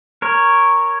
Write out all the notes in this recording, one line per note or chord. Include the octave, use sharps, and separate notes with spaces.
A#4 C#5